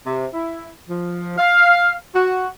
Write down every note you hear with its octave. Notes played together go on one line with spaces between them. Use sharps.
C3
E4
F3
F5
F#4